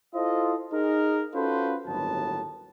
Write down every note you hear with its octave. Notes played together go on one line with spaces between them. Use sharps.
E4 F4 A4 C5 D#5
D#4 G#4 A#4
C#4 F4 F#4 A4 B4 C5
G1 D#2 A2 F#3 B3 A5